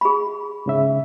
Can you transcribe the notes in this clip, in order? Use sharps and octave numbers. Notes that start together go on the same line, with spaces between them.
G#4 B5
G#2 C#3 E5